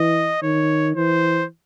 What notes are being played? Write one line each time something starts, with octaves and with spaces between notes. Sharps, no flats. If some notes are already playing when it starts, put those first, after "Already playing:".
Already playing: E3 D#5
D#3 C#5
E3 C5